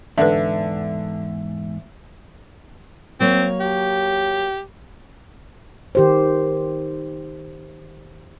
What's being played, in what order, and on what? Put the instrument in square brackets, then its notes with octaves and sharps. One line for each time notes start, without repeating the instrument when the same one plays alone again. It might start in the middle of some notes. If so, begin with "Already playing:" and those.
[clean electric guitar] E2 G#2 [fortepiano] D3 [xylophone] A4 B4 [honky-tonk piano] E5
[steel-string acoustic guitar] F#3 A#3 C#5 [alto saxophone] C4
[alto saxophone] G4
[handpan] D#3 G4 C5